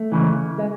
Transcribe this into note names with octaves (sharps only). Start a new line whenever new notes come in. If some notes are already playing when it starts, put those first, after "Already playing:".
Already playing: A3
C#2 C#3 E3
G#3